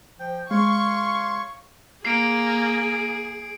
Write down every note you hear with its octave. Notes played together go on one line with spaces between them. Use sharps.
F3 G5
G#3 C#5 F5 C6 C#6
A#3 G#4 C7 D7